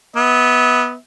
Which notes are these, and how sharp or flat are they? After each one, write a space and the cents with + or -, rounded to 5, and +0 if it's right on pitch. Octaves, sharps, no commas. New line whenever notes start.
B3 -5 E5 -40